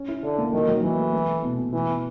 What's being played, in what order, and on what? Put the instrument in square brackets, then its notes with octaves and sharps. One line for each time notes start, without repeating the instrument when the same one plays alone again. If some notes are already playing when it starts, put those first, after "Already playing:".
Already playing: [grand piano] C#4
E4
[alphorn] D3 [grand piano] C#4
[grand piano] A#3
[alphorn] D#3 [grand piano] F#3
[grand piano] F#3
[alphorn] E3 [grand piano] F#3
[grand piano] A3
A3
A3
B2
B2
[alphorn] E3 [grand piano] E4
[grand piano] B2